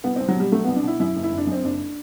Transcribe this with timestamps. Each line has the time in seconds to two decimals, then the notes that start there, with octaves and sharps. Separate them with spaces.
0.04 C2 B3
0.16 C2 C4
0.28 F#3
0.36 B2 G3
0.52 F#3 A3
0.64 C2 B3
0.76 D4
0.84 B2 E4
1.00 F#2 E4
1.16 F#1
1.23 E4
1.31 F#1
1.37 D4
1.47 F#2 C4
1.63 F#1 D4